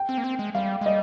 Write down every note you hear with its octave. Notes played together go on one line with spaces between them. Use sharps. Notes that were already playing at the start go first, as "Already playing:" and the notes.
Already playing: G5
C4
A#3
C4
G#3
G3 F5
G#3
G3 D#5